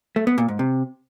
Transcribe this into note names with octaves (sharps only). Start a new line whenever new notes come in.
A3
B3
A#2
G#2
C3